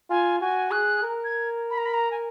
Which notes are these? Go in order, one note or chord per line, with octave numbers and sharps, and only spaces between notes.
F4 G#5
F#4 G#5
G#4 F#6
A#4
G#6
B5
A#5
B5
A#5
G#5